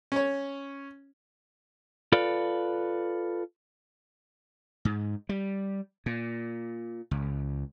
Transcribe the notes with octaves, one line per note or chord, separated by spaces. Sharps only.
C#4 C#5
F4 A4 B4 D5 F5
G#2
G3
A#2
C#2